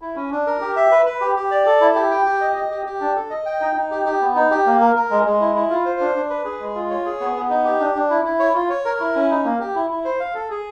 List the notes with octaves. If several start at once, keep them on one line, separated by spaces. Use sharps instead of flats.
E4
C#4
D4
A#4
G4
E5
B4
B4
G4
G4
D5
A4
E4
G4
G5
G4
D#5
D#5
G4
G4
D4
A4
D#5
G5
D#4
D#4
G4
G4
B3
D#4
G4
A#3
A#4
A#4
G#3
G#3
E4
E4
F4
C5
D4
D4
B4
G#4
G#3
F4
C#5
G#4
B3
B3
D#4
G4
D4
D4
E4
E4
C#5
F4
C#5
A#4
E4
C#4
D#4
A#3
G4
E4
E4
C5
F5
A4
G#4